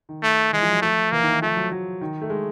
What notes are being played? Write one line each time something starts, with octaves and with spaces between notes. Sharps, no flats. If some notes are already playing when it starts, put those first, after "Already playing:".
D#3
A3
E3 G#3
F3
F#3
F3 A3
E3 A#3
D#3
E3
F3 A3
F#3
F#3
D#3
A3
G#3